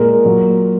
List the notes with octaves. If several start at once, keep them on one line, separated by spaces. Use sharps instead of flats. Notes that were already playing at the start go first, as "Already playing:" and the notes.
Already playing: A#2 G#3 A#4
A#2 F#3